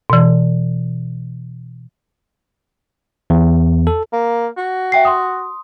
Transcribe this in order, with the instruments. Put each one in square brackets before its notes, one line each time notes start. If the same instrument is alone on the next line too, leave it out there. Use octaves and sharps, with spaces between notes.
[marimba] B2 E3
[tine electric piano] E2
A4
[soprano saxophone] A#3
F#4
[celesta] E5 G5 C7
C6 D#6